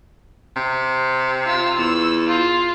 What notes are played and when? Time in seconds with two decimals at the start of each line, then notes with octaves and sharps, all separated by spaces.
0.56 C3
1.46 F4 E6
1.78 E2 E6
2.28 F4